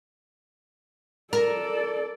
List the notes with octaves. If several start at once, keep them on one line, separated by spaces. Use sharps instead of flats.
A4 A#4 D5